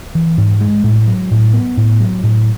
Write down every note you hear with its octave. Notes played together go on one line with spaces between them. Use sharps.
E3
G#2
G#3
A2
F#3
A2
B3
A2
F#3
A2